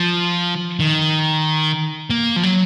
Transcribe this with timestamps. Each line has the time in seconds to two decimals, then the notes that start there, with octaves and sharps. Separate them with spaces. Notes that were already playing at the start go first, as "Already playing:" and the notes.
Already playing: F3
0.80 D#3
2.10 A#3
2.36 F3
2.43 F#3